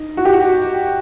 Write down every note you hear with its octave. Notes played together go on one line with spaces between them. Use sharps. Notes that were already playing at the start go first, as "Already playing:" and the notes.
Already playing: D#4
F#4
G4
F#4